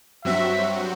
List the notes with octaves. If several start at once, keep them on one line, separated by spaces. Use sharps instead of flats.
G2 F#3 C4 F#4 E5